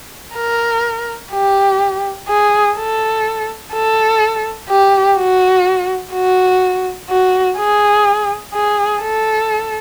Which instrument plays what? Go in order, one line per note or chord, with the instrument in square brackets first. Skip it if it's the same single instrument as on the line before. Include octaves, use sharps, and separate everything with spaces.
[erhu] A#4
G4
G#4
A4
A4
G4
F#4
F#4
F#4
G#4
G#4
A4